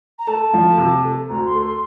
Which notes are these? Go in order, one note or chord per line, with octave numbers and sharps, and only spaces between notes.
A#5
A3 A5
F3
C3
A3
D2 A#5
C6
A3
C6